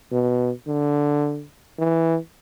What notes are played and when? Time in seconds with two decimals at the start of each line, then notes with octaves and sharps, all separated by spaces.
0.12 B2
0.67 D3
1.78 E3